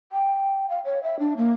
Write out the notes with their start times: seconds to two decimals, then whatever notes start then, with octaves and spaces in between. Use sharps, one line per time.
0.12 G5
0.70 F5
0.85 C#5
1.03 E5
1.19 D4
1.37 A#3